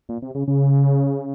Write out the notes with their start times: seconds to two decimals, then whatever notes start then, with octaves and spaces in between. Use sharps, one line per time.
0.09 A#2
0.22 C3
0.35 C#3
0.48 C#3